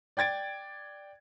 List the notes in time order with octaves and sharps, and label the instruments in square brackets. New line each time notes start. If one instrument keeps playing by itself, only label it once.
[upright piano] D5 G5 G#6 A6 D7